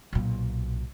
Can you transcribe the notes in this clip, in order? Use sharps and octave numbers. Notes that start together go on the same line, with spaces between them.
B1 A#2